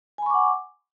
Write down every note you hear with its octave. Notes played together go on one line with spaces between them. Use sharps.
F#5 G#5 B5 C#6 D6